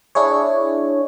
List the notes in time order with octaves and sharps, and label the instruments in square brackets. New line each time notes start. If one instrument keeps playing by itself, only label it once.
[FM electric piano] D4 E4 G#4 C#5